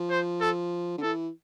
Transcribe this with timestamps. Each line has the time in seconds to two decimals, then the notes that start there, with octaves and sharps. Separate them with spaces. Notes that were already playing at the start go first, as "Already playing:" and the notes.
Already playing: F3
0.10 C5
0.41 A4
0.98 D3
1.02 E3 A4